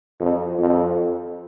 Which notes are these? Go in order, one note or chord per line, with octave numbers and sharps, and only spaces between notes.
F2
F2